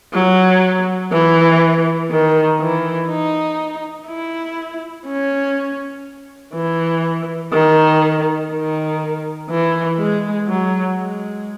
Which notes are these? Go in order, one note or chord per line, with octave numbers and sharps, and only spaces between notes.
F#3
E3
D#3
E3
D#4
E4
C#4
E3
D#3
D#3
E3
G#3
F#3
G#3